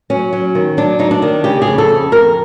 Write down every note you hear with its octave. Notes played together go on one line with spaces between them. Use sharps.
F#3 C#4
F#3
D#3
F#3 D4
F#3 D#4
D4
D#3
C#3 G4
G#4
F2
A4
F2
F2 A#4